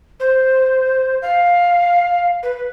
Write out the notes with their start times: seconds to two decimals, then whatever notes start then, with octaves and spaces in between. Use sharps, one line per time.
0.20 C5
1.22 F5
2.43 B4